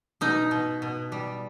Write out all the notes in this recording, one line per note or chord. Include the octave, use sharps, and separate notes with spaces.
B2 D#4
B2
B2
G3